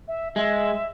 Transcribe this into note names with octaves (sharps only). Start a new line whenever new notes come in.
E5
G#3 E5